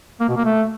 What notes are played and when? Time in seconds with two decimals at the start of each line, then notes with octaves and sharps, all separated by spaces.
0.20 A#3
0.28 B2
0.37 A#3
0.45 A3